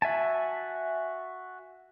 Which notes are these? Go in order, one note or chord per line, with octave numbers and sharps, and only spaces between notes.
F#4 E5 G#5 A5